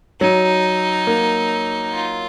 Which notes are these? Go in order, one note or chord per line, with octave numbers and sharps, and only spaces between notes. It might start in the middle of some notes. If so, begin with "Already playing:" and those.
F#3 D#4
A#3
F4